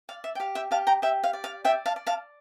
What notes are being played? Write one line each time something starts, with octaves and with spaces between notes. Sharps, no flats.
D5 F5
E5
G5
G4 F5
E5 G5
G4 F5 A5
G5 A#5
G4 E5 G5
F5
D5
F5
D5 E5 G5
F5 A5
D5
F5 A5